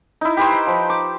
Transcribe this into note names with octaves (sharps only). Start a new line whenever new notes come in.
D#4 E4
G4 B4 C5
F3
D6